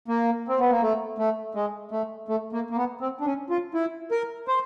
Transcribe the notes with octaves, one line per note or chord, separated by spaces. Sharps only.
A#3
C4
B3
A#3
A3
A3
G#3
A3
A3
A#3
A#3
B3
C4
D4
C#4
F4
E4
A#4
C5